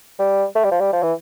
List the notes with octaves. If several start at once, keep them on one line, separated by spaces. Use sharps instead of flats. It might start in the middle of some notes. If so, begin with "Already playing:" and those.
G3
A3
G3
F3
G3
F3
E3